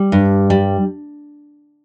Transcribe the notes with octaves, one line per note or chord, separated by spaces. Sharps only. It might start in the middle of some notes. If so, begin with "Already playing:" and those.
Already playing: G3
G2
G3